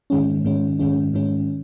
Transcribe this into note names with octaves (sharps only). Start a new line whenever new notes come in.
G#2 D#3 G#3 C#4
G#2 D#3 G#3 C#4
G#2 D#3 G#3 C#4
G#2 D#3 G#3 C#4